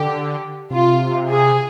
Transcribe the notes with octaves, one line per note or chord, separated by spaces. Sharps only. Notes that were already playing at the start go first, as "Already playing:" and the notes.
Already playing: D3 G4
C3 F4
G#4